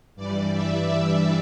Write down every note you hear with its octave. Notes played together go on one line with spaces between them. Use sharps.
G2 E3 G3 D5
E5
E5